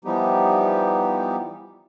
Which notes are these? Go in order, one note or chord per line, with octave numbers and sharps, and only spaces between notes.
E3 F3 G3 B3 D#4 G4